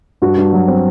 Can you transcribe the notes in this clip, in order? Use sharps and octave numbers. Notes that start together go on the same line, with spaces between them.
G2 F#4
G2
F#3
C4